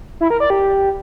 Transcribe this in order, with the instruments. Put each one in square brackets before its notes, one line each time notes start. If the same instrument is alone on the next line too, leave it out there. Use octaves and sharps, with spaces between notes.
[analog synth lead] E4
A#4
D5
G4